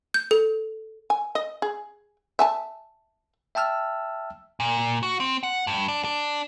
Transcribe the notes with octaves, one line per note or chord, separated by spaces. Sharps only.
G6
A4
G#5
D#5
G#4
E5 G#5 A5
E5 G5 A5 E6 F6
A#2
F#4
C4
F#5
G2
D4
D4